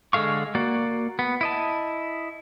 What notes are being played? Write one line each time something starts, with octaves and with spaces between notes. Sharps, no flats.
D3 G#3 A4 F5 C#6
A#3 F#4 D5
B3
E4 D#5 A5